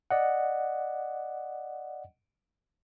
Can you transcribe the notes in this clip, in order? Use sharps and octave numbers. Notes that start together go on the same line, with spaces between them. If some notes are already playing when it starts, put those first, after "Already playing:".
D5 D#5 F#5